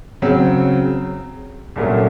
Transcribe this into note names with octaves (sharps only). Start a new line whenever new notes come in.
C#3 F#3 C4
C2 A#2 F#3 A3 C#4